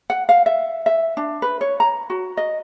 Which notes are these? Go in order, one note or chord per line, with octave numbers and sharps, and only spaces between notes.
F#5
F5
E5
E5
D4
B4
C#5
A#5
F#4
D#5